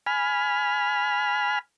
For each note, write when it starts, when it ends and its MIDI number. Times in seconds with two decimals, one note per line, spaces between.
0.07 1.59 80
0.07 1.59 83
0.07 1.59 89